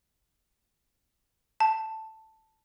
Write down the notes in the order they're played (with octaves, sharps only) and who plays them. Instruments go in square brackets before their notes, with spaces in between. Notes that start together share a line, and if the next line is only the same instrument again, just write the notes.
[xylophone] A5